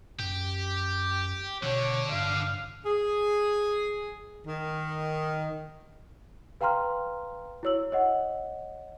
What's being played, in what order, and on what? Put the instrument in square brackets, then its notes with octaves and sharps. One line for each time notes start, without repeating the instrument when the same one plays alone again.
[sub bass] F#2 [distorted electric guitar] G4
[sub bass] B2 [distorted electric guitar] D3 D4 [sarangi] C#5
[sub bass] G2 [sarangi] F5
[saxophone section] G#4
D#3
[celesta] B4 F5 G5 A#5 C6 F6
E4 F#4 C#5 E6 F#7
C#5 D#5 F#5